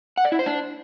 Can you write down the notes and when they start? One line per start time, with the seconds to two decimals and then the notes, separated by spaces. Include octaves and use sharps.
0.17 F#5
0.25 D5
0.32 E4
0.39 C5
0.46 D4